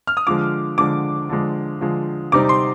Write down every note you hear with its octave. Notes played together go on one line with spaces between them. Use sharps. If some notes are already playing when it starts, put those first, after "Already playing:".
F6
D#6
D3 F3 G#3 D6
D3 F3 G#3 D6
D3 F3 G#3
D3 F3 G#3
C3 G3 C4 D#4 D6
C6